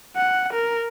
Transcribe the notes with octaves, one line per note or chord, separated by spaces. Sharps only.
F#5
A#4